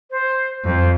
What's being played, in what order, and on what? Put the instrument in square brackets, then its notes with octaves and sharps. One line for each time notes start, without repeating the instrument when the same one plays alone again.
[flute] C5
[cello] F2 [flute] C5